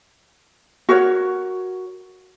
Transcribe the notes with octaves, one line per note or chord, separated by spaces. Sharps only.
F#4 A#4 C#5